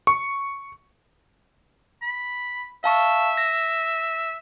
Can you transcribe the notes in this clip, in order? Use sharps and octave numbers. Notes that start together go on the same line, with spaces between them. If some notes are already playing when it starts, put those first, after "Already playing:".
C#6
B5
E5 F5 A5 C#6
A#6